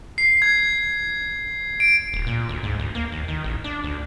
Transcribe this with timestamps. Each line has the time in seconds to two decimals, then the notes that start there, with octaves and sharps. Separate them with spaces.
0.18 C7
0.42 G#6
1.80 D7
2.13 D1
2.27 A#2
2.49 D2
2.63 G#2
2.79 D2
2.95 A#3
3.12 D#2
3.28 D#3
3.44 A1
3.64 D4
3.84 D2